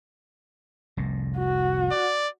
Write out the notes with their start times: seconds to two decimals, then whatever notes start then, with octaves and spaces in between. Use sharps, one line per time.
0.97 F1 C2 A2
1.38 F#4
1.91 D5